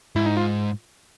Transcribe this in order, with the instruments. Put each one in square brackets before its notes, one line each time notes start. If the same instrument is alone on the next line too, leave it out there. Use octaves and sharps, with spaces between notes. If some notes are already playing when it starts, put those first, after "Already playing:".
[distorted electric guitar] G#2 [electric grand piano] E4
[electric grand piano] D#4
F4